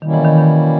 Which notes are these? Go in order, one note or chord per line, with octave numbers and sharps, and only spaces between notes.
B2 D#3 G3 A#3 C#4 E4
E3
D#3
D#3